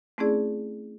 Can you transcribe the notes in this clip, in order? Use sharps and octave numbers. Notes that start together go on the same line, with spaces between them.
A3 C4 C#4 E4 G#4 D5